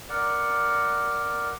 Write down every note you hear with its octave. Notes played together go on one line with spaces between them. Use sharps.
A#4 D5 F#5